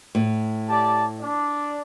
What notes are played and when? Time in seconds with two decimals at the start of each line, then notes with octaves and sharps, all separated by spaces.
0.15 A2
0.69 G4 D5 A5
1.20 D4 D5